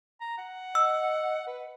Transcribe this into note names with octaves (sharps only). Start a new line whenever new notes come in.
A#5
F#5
D#5 E6
B4